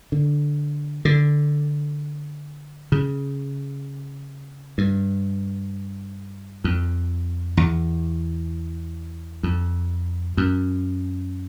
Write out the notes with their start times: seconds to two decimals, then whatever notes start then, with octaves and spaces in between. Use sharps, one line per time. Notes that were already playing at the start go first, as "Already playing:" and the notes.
0.12 D3
1.05 D3
2.92 C#3
4.78 G2
6.64 F2
7.57 E2
9.43 F2
10.37 F#2